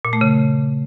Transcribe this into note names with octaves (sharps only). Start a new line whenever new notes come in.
A#2
A3
C#3